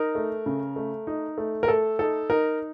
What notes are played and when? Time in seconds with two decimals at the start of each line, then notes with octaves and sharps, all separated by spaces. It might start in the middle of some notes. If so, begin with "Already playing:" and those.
Already playing: D#4 A#4
0.15 A3
0.46 C#3
0.76 A3
1.07 D#4
1.38 A3
1.63 A#4
1.68 A3 A4
1.99 D#4 A4
2.30 D#4 A#4